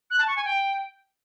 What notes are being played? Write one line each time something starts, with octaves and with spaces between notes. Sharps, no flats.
F#6
A5
C#6
G#5
G5